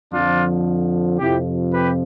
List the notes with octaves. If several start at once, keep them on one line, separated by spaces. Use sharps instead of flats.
F2 D3 F3 D4 F4
F2 C3 F3 E4 G4
G4 B4